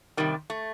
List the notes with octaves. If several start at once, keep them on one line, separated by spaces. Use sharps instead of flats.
C3 D#3 G3
A3